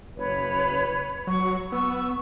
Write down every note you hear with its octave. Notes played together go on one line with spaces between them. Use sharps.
F#1 B4 C#5
F#3 C#6
B3 C#6 E6